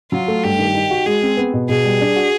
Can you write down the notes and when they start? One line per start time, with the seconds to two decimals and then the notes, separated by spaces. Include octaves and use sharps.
0.12 F#3 F4
0.28 A3
0.44 G2 G4
0.59 D#3
0.75 D#4
0.91 F#4
1.06 G#3 G#4
1.22 C4
1.37 B3
1.54 B2
1.69 B2 G#4
1.84 G3
2.01 D4
2.16 F#4